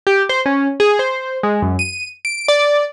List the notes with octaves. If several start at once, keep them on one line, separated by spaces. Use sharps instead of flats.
G4
C5
C#4
G#4
C5
G#3
F#2
D#7
D7
D5